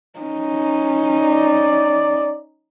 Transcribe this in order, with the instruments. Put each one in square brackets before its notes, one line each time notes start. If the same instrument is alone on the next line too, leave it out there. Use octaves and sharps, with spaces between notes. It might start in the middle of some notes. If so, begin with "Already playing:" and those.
[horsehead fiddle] C#4 D#4
[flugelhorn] D5